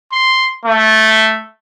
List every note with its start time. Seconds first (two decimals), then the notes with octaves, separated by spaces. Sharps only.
0.12 C6
0.65 A3